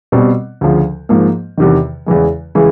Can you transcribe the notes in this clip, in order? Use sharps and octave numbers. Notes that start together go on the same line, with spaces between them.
B2 G3 C4
D2 C#3 F3
G#2 F3 A#3
E2 C3 D#3
E2 C#3 E3 G#3
C#3 E3 G#3